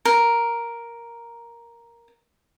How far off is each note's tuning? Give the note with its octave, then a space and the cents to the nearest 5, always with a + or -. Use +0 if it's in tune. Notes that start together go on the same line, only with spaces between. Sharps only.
A#4 +5